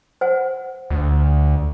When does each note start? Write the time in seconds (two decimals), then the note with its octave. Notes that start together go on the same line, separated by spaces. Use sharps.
0.21 C5 F#5
0.90 D2